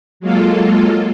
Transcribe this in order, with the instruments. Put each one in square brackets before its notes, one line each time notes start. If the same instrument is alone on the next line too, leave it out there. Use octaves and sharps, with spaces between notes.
[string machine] F#3 G#3 A#3 F4 A4